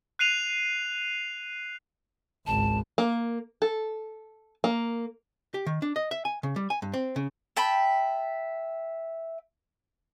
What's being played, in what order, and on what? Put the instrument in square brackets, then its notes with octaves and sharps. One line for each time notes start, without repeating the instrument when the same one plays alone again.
[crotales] F#6 C7 D#7 F7
[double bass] G#1 C#2 [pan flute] A5
[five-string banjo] A#3
A4
A#3
[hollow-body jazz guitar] G4
D#3
D4
D#5
E5
G#5
C#3
G3
G#5
G2
C4
C#3
[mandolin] E5 G5 A5 B5